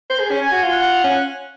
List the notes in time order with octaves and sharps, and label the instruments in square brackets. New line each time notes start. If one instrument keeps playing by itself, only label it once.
[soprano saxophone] C5
G#4
C#4
[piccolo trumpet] G#5
[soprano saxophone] F#4
F4
[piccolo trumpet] F#5
[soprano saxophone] C#4